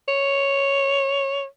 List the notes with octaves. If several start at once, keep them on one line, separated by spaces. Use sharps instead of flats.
C#5